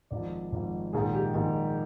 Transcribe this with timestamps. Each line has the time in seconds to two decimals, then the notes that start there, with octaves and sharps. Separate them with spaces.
0.11 G#1 G#2 F3 D5
0.52 G#1 G#2 F3
0.93 A#1 G#2 D#3 G#4
1.14 G4
1.34 A#1 G#2 D#3